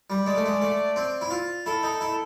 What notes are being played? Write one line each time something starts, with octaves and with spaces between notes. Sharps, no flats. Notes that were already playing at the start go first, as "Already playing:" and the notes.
G3
G#3 D5
A3
G#3
A3
C4
E4
F4
E4 A4
D#4
E4